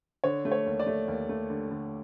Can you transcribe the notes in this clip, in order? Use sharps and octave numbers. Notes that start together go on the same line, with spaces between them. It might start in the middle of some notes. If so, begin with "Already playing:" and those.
D3 C#5
A3
C#5
D#2
D5
A3
D#2
A3
D3
D3